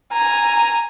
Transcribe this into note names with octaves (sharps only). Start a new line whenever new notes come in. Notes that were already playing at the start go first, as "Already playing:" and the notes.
G#5 A#5